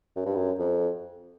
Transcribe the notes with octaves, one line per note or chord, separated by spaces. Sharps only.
F#2
G2
F#2
F2